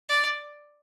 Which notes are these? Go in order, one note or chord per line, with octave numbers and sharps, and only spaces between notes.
D5